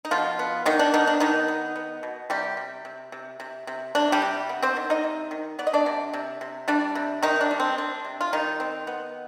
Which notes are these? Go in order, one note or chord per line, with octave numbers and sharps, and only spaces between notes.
D#4
B2 F3 F4
B3
D#3 B3 D#4
D4
D#3 B3 D#4
D4
D#3 B3 D#4
B3
B3
B2
C3 G3 G4
C3
C3
C3
C3
C3
C3 D4
G3 G4
C3
B3
C4 C5
D#3
D#4 D#5
C3
D#3
B3 D5
D#5
D4 D5
C3
C3
C3
G3 D4 D5
C3
C3 D#3 D#4
D4
G3
C4
C4 D4
C3
F4
D#3 G3 D#4
C4
B3